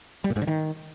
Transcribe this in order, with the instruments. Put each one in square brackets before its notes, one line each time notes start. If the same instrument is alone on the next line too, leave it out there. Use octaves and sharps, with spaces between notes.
[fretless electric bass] G3
A#2
G#2
D3
D#3